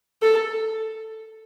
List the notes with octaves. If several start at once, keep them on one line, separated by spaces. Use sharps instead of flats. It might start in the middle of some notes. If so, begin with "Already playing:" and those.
A4